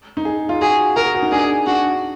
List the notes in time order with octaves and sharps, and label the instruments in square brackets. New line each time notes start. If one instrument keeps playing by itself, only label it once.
[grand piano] D#4
G#4
F4
[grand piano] F#4 [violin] G#4
[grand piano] F#4 [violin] A#4
[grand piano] G#4
F#4
D#4
[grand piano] D4 [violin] G#4
[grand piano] D4 [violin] F#4